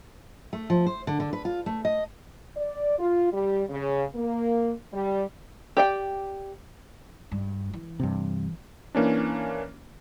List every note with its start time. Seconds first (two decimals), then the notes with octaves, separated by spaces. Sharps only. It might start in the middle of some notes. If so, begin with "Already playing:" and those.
0.53 A3
0.70 F3
0.86 C5
1.07 D3
1.20 D3
1.33 B4
1.45 F4
1.66 A3
1.85 D#5
2.56 D5
2.99 F4
3.32 G3
3.70 C#3
4.14 A#3
4.93 G3
5.77 G4 D5 G5
7.32 G2
7.73 E3
8.00 G2 C3
8.95 E3 A#3 C#4 D4